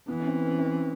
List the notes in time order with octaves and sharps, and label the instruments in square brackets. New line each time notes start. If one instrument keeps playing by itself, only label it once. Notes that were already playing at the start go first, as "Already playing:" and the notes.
[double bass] E3 [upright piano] B3
[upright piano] C#4
C4
C#4
C4
C#4